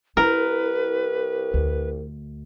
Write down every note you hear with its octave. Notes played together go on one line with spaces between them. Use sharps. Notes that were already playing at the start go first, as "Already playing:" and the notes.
C2 E4 A#4 B4
D2